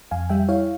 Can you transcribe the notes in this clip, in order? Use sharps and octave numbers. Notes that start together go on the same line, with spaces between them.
F2 F5 G#5
G3 E5 G5
E4 C#5 F5